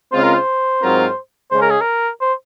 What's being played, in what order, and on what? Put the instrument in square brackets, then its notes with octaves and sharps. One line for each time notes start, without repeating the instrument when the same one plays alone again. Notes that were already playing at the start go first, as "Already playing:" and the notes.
[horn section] C#3 G#3 C4 F4 [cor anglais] C5
[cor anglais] A#4
C5
[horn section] G#2 F#3 C4 F4 A#4
[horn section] C#3 G#3 C#4 [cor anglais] C5
[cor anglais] A#4
G#4
A#4
C5